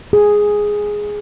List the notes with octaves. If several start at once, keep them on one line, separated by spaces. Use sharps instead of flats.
G#4